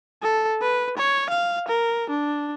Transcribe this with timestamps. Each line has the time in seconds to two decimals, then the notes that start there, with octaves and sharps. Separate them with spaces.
0.23 A4
0.62 B4
0.98 C#5
1.30 F5
1.68 A#4
2.10 D4